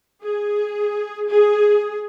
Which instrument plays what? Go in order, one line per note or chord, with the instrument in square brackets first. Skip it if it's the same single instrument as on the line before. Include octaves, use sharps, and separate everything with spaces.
[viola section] G#4
G#4